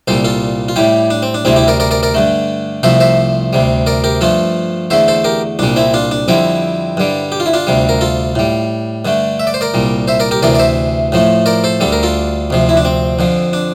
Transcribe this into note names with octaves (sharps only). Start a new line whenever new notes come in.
C2 A#2 G3 A4 C5
F4 A4
F4
A2 G3 E4 G4
D4
C4
D4
D2 C3 G3 C4 E4
E4 G4
A#4 D5
A#4 D5
A#4 D5
A#4 D5
G2 D3 A3
C2 C3 F3 A3 C5 E5
C5 E5
D2 C3 G3
A#4 D5
G4 A#4
G2 F3 A3 F4 A4
E2 D3 A3 C5 E5
A4 C5
G4 A#4
C2 A#2 G3 D4
C4 E4
D4 F4
D4
F2 D3 G3 C4 E4
G2 D3 G3
G4
F4
E4
D4 F4
D2 C3 G3
A#4
F4 A4
A2 G3
G2 D3 A3
E5
D5
C5
A#4 D5
C2 A#2 G3
C5 E5
A#4 D5
G4 A#4
D2 C3 E3 A#4 D5
D5
C5 E5
A2 F3 A3
A#4 D5
A4 C5
D2 D3 G3 A4
A#4
F4 A4
D2 C3 F3
E4
D4
C4
F2 D3 F3
D4